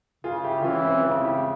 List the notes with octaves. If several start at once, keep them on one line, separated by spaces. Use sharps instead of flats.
C#3 F4 G#4
E4 G4
G4
E3 C#4 F4
C4 E4
C#3 C4 E4
E4 G4